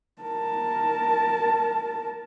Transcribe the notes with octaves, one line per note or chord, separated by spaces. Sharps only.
A#4 A5